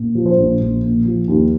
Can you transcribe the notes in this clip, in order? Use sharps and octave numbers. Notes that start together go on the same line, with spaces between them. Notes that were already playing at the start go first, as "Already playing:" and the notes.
Already playing: A#2
F3
C5
A#1
A#1
A#2
F3
D#2